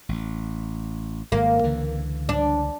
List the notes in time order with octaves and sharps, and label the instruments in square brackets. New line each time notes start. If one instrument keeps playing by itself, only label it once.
[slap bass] A1
[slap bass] G#1 G#2 [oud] A#3
[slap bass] C#2 D3 E3
[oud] D4